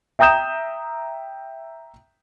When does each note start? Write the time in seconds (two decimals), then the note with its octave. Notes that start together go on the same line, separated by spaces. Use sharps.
0.19 E5 G5 A#5 D#6 G6 E7